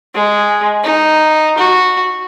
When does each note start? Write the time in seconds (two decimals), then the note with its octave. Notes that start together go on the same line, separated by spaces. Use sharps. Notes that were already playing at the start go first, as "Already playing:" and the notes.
0.15 G#3
0.84 D#4
1.58 F#4